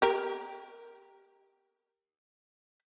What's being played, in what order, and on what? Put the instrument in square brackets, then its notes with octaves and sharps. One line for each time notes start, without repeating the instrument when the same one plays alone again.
[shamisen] G4 A#4